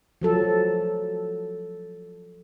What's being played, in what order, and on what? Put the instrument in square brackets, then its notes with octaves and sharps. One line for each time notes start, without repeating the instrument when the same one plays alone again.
[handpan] F3 F#3 A4